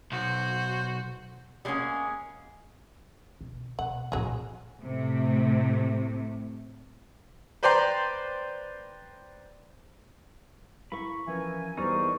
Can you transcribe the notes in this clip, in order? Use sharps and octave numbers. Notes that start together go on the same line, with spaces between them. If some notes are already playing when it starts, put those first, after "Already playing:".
B1 F#4 C5
G3 G#3 A#3 B3 C#4 G#4
B2
B2 F#5
A#1 A2 F#3 G#4
A2 C3 A3
B4 C5 D5 G5 A#5 C6
E4 A#4 F5 B5 C#6
E3 F3 C#4 A#4 E5 G#5
E2 E3 G3 D#4 A#4 C5 D5 C#6